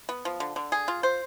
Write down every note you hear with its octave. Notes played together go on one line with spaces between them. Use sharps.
B3
F3
D3
D3
G#4
F4
C5